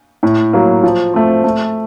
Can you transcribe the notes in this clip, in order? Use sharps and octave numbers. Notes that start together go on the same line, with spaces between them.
A2
F#3 A#3
F3
A3 C4
A3